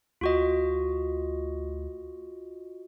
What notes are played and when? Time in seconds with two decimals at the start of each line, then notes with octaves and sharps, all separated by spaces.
0.21 D2 F4 F#4 D#5